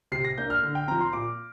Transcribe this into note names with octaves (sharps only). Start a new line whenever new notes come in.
C3 C7
A#6
A#3 D4 G6
F6
D3
G5
F3 C4 A#5
C6
A#2 D6